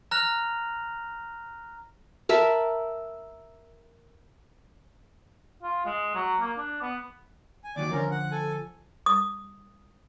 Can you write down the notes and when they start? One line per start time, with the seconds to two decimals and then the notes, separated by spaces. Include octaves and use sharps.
0.11 A#5 F6 F#6 A#6 F7
2.29 A#4 E5 A5 B5
5.62 F4
5.86 G#3
6.15 F#3
6.40 A#3
6.58 D4
6.82 B3
7.64 G#5
7.76 D#2 D#3 F#3 D5 D6
7.91 D3 F3 C#4 A#4
8.11 F#5
8.31 A4 G#5
9.06 D#6